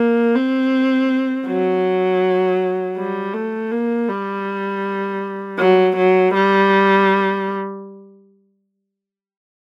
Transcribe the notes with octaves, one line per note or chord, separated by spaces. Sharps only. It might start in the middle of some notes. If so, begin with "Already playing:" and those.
Already playing: A#3
C4
F#3
G3
A3
A#3
G3
F#3
F#3
G3